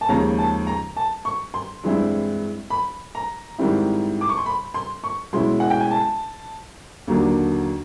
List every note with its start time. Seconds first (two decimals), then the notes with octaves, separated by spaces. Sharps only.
0.01 A5
0.09 D#2 C#3 F3 G#3 A#5
0.38 A5
0.67 A#5
0.97 A5
1.25 C#6
1.54 C6
1.83 G2 E3 G#3 C4 E4
2.70 B5
3.15 A#5
3.58 G#2 D#3 G3 C4 E4
4.21 D6
4.29 C#6
4.38 C6
4.46 B5
4.74 C6
5.04 C#6
5.33 B2 G#3 C#4 E4 C6
5.60 F#5
5.70 G5
5.81 G#5
5.91 A5
7.07 D#2 D3 F#3 A#3 D4